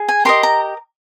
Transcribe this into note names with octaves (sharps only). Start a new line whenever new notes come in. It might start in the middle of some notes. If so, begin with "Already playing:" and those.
Already playing: G#4
G#5
G4 A#4 D#5 C6
A#5